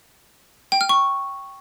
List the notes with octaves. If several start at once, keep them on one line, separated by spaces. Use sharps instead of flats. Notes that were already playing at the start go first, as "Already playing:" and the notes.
G5
F6
C#6